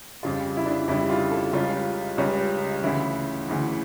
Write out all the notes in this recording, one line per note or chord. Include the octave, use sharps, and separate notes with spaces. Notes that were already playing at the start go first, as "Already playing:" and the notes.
F2 C#3 G3 F4
E4
D4
F2 C#3 G3 E4
F4
A4
C#2 C#3 G3 C#4 F4
C#2 C#3 G3 C#4
D2 C#3 E3 E4
D2 C#3 E3